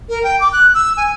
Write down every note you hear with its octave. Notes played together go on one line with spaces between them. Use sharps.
A#4
G5
D6
F#6
E6
G#5